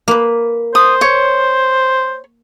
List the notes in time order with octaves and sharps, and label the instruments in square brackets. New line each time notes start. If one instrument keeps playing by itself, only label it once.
[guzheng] A#3 B4
[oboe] C5 [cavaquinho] D#6
[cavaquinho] C#5